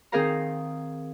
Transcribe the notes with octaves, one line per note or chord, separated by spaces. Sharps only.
D#3 C4 G#4 A#4 F5 A#5